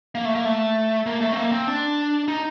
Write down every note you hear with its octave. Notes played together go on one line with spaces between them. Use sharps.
A#3
A3
A#3
A3
A#3
A3
C4
A#3
C4
D4
D#4